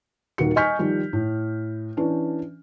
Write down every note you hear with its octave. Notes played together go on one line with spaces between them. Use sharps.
D#1 D#3 A#3 F#4 C#7
D#5 G#5 C#6 F6 G6 B6
D#3 F3 G3
A2
E3 C#4 D4